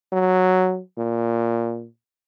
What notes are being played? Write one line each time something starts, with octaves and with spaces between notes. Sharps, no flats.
F#3
A#2